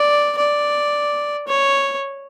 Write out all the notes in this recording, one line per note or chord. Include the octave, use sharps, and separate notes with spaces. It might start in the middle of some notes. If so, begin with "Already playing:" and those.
Already playing: D5
D5
C#5